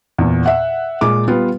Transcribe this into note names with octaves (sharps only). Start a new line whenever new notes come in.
E2 A#2
E5 F#5
A#2 G#3 D6
G3 B3 F4